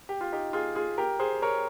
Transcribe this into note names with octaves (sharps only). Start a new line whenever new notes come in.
G4
F4
D#4 G4
F4 G#4
F4 G#4
G4 A#4
G#4 C5
A#4 C#5